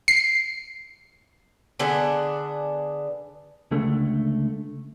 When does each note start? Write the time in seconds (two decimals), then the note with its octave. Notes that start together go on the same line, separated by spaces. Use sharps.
0.08 C7
1.79 D3 B3 D4 G#4
3.71 C#2 D3 A3